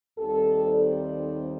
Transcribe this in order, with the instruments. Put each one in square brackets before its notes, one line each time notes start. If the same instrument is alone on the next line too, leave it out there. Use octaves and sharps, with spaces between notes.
[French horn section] D#2 D#3 G3 C4 D#4 G4 A4
C5 D5